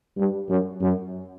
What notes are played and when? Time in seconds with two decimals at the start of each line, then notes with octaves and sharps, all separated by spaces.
0.18 G2
0.49 F#2
0.82 F#2